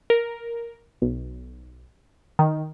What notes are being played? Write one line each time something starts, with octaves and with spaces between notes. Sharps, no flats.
A#4
B1
D#3